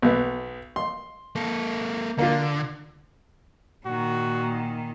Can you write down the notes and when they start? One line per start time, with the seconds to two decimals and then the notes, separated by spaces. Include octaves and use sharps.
0.02 B1 B3
0.76 C6
1.36 A#3 A4
2.18 D3 A#3 F4
3.86 A#2 D#3 F#4